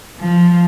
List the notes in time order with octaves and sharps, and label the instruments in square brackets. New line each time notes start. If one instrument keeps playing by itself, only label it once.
[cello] F3